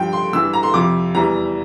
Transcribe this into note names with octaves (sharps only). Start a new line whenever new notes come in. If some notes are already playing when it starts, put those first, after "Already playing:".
Already playing: G2 F3 G5
C6
G2 E3 G3 E6
A#5
C6
F2 C3 F3 D6
E2 E3 G3 A#5